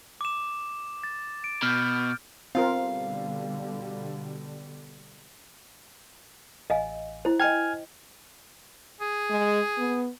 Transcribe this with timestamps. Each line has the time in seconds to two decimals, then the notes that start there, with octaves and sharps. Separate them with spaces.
0.21 D6 E7
1.04 A6
1.44 D7
1.63 B2 F6 G6
2.55 B2 D3 G3 C4 F4 A#4 F5
6.70 A1 D#5 F5 G#5
7.25 E4 C5
7.40 D#5 G5 G#5 F6 G#6
9.00 G#4
9.30 G#3
9.78 B3